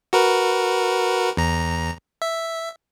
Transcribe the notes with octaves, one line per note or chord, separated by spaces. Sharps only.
F#4 A#4 B4
E2 A#5
E5